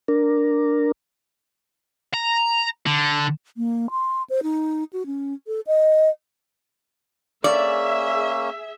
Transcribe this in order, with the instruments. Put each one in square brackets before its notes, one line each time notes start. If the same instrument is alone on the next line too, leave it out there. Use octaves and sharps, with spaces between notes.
[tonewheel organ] D4 A#4
[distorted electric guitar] A#5
D3
[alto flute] A#3
C6
C5
D#4
F#4
C#4
A4
D#5
[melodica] A#3 C#4 [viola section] G#4 E5 [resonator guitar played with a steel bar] D5